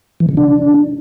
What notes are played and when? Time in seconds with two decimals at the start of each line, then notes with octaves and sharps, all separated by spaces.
0.20 E3
0.29 C#3
0.37 D4